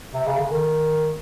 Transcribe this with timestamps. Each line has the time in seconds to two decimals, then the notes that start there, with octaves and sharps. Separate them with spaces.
0.14 C3
0.27 C#3
0.38 D3
0.50 D#3